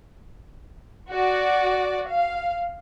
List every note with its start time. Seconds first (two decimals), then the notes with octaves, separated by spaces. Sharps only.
1.10 F#4 D5
2.09 F5